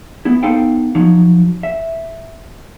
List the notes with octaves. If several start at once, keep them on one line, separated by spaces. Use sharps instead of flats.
B3 E4
B3 D#4 A4 C5 F5 G5
F3 F#3 D#4
E5